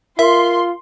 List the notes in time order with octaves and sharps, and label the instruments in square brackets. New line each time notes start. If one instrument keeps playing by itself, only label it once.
[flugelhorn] F4 [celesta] A#4 [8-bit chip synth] E5 [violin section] C6